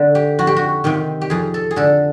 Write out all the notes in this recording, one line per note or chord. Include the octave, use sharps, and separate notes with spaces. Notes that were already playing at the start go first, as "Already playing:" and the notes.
Already playing: D3 A4
G4
F2 F#4
G4
F#4
C3 D#3 G4
G4
F2 G#4
A4
G#4
D3 A4